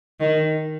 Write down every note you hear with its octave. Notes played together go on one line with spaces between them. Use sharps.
D#3